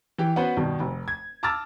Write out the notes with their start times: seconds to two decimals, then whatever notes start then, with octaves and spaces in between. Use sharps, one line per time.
0.18 E3 G4
0.36 B3 C#4 F#4 B4 C5
0.57 G2 B2 D#3
0.80 F1
1.08 G#6
1.43 A5 A#5 D6 E6 F6 A6